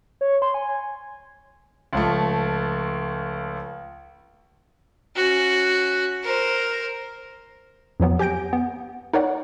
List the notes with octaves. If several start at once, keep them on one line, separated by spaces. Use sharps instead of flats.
C#5
C6
G#5
C#2 F3 A3
C#4 F#4
A#4 C5
F2 F3 F#3 B3
G4 G#5 G6 A#6 D7
B3
D#4 A#4 C#5 D5 F#5